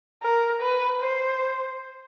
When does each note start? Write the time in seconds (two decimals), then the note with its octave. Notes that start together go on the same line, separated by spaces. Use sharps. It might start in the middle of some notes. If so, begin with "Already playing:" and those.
0.23 A#4
0.61 B4
1.01 C5